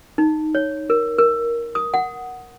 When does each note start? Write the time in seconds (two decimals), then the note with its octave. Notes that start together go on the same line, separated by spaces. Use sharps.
0.18 D#4
0.55 C#5
0.90 A#4
1.19 A#4
1.75 D#6
1.94 F#5